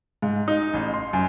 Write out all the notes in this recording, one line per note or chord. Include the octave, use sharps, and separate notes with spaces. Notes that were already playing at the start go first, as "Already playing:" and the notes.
G#2
D#4
A1
C6
F#2